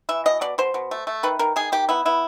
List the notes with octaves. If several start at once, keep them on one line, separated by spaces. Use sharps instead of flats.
E3 E5
B2 D#5
B2 D5
B2 C5
B2
A3
A3
D#3 B4
D#3 A#4
D#3 G#4
D#3 G4
B3 E4
B3 E4